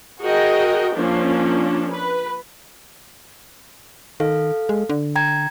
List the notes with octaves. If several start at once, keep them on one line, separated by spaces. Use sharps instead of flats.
F#4 G#4 A#4 D#5 G5
F3 A#3 C#4 D4
B4
D#3 A4 F5
G#3
D3
G5 A#5 G#6